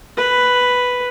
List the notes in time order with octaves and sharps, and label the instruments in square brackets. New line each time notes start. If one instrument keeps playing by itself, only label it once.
[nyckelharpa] B4